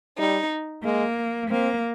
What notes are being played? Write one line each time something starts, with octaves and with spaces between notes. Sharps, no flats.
G3 D#4
G#3 A#3
A#3 C4